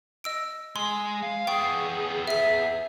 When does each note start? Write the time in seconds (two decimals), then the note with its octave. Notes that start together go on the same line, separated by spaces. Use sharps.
0.24 D#5 E6 D7
0.76 G#3 C6
1.22 F5
1.47 B3 G#4 G5 C#6
2.27 E5 B6